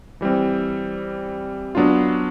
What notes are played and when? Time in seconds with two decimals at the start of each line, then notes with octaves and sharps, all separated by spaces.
0.21 E3 G3 C4
1.75 F#3 B3 D4 F4